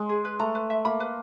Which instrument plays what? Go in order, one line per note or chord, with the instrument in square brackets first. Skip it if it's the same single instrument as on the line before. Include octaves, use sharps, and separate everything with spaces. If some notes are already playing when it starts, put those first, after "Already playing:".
Already playing: [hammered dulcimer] G#3
[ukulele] G#4
B4
[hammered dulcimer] A3 [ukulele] A#5
[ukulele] B4
E5
[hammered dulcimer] A#3 [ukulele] B5
[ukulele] B4